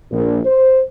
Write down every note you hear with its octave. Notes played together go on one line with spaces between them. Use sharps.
A#1
C5